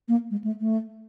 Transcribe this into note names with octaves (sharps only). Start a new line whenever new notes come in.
A#3
G#3
A3
A3